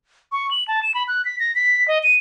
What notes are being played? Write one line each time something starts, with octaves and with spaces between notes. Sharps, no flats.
C#6
F#7
A5
E7
B5
F#6
B6
A#6
B6
D#5
D#7